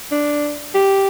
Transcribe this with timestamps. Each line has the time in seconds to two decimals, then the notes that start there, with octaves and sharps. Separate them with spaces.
0.11 D4
0.75 G4